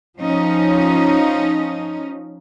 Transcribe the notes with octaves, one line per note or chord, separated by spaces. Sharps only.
F3 C#4 D#4